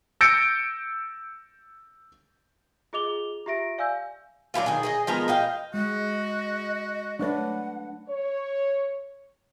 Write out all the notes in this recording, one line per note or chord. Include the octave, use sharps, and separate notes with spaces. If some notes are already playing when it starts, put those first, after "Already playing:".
E6 G6 A6 A#6 C#7 D7
F4 G#4 D#5 D6 F7 G7
F4 G4 E5 A#6 D7
D5 F5 G#5 E6 G6
F#3 D4 E4 F4
D#3 G#4
G#4 C5 D#5
F3 G#3 B3 A#4
D#5 F5 G5
G#3 F#4 D#5
F#3 A3 D4 B4 C#5 F#5
C#5